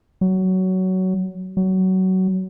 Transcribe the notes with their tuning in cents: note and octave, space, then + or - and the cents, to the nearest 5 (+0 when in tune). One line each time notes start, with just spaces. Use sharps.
F#3 +15
F#3 +20